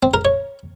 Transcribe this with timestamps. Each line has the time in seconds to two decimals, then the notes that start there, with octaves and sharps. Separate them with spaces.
0.03 C4
0.14 A#4
0.25 C#5